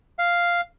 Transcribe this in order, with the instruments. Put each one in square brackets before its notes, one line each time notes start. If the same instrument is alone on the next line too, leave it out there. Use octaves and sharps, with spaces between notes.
[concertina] F5